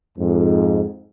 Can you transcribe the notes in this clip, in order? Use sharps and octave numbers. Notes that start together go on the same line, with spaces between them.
F2 G#2